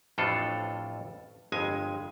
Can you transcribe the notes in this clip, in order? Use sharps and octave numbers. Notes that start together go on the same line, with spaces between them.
A1 F2 A2 D4 F4 A4
G1 F2 G#3 G#5